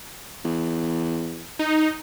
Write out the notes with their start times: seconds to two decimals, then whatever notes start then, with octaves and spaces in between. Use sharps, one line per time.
0.44 E2
1.59 D#4